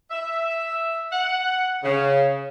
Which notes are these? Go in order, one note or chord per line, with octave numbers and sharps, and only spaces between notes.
E5
F#5
C#3